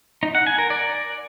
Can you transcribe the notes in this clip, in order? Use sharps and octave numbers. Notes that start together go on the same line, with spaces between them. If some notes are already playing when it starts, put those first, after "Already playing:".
D#4
F#5
G#5
A#4
D5